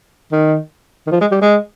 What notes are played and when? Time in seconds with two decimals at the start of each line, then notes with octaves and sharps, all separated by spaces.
0.32 D#3
1.07 D#3
1.11 F3
1.21 G#3
1.31 G3
1.41 G#3